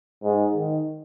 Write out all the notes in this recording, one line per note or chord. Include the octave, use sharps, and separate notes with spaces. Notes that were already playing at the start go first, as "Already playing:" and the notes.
G#2
D#3